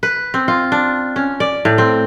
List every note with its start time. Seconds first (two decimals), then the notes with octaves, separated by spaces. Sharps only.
0.03 B4
0.34 C4
0.48 F4
0.72 D4
1.16 C#4
1.40 D5
1.65 A2
1.78 C4